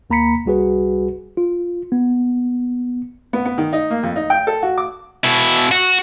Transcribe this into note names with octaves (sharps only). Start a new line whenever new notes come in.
D#2 A#3 A#5 B5 B6 C#7
C2 G3 F#4 G#4 B4
F4
B3
B3
B3
D#3
D#4
A#3
F2
D#4
G5
A4
F#4
D6
B2 E4
F#4